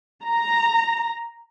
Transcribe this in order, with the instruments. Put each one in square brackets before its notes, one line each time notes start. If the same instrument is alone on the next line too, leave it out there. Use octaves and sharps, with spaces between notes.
[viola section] A#5